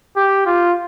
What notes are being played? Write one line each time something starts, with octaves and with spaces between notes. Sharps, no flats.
G4
F4